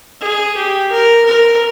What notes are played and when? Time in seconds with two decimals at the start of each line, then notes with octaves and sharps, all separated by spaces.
0.21 G#4
0.57 G4
0.91 A#4
1.26 A#4